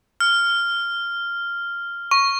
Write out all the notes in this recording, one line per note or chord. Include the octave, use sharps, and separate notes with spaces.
F6
C#6